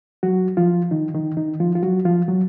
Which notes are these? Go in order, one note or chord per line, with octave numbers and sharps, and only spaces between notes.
F#3 F#4
F3 F4
D#3 D#4
D#3 D#4
D#3 D#4
F3 F4
F4
F#3 F#4
F3 F4
F#3 F#4